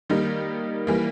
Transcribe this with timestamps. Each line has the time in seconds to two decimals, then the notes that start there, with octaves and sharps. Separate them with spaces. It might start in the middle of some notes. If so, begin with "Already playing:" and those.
0.10 D#3 G3 A#3 D#4
0.87 E3 G3 A#3